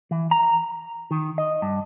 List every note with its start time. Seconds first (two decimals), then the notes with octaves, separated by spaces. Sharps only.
0.11 E3
0.31 A#5
1.11 D#3
1.38 D#5
1.62 G2